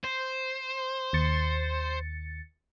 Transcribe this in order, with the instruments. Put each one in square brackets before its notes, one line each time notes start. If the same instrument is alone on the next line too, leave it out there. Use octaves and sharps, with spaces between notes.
[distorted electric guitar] C5
[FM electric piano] D#2 A6 C#7